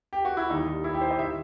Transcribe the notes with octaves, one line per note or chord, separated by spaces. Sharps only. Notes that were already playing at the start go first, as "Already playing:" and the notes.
G4
F#4
E4
D#2 D#3 G3 D#4
E4
G4
C5
D#5
D#3 G3 E5